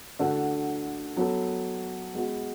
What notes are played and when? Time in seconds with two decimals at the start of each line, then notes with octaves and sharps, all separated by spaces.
0.19 D3 A3 D4 F#4 A4
1.17 F#3 B3 F#4 A4
2.14 G#3 B3 F#4